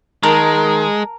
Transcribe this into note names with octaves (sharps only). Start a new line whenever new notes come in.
D#3 G#3 A#4 A5